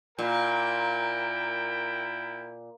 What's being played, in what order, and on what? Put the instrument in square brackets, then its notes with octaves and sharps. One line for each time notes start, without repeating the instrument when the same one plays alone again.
[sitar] A#2 [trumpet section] E4 A#4 G5